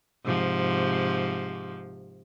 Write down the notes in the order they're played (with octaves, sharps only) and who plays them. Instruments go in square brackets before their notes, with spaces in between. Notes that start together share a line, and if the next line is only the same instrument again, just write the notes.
[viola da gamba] G#2 C3 F3